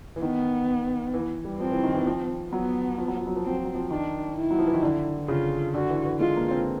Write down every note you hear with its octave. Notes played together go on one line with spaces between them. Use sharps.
E3
D#3 B3
E3
G3
F3 C4
E3
D#3
E3
F3
F#3 B3
F3
F#3
F3
F#3
F3
F#3 C4
F3
F#3
F3
D#3 D4
E4
F#3
F3
E3
D#3
D3
C#3 F4
D3 F#4
E3
E3
G#3 F4
A#3
C4